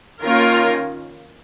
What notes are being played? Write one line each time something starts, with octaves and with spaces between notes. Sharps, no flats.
D#3 A#3 C#4 F4 A#4